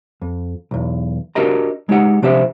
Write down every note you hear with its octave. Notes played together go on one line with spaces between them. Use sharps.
F2
B1 E2
D4 F#4 G4 A#4 D#5 A#5
G#3 D#4 G4 F#5
C3 F3 D4 G4 C5 E5